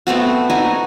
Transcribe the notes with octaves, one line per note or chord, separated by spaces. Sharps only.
A3 B3 C4 F#4
D#4 F#4 D#5 G#5